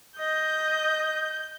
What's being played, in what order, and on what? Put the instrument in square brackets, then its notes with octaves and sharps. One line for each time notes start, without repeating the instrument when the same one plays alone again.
[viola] D#5 [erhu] G6